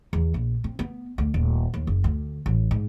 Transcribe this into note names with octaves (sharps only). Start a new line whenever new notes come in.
E2
A#1
C4
B3
D2
D#1
D#2
F#1
D2
A1
G#2